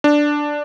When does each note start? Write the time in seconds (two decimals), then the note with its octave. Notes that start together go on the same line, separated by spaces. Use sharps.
0.04 D4